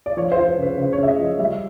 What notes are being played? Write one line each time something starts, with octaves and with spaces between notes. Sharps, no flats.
D5
F3 C#5
C5
F3
B4
C#3 B4
C#3 C5
C#5
C#3 E5
D#5
F3
D#5
G3 E5